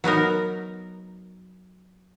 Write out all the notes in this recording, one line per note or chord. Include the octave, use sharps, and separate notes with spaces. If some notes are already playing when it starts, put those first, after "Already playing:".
F#3 B3 D#4 A#4